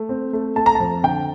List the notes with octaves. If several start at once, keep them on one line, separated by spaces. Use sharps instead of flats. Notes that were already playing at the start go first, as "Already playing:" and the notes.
Already playing: A3
C4
A3
A3 A5
A#5
F2 A5
D3 G5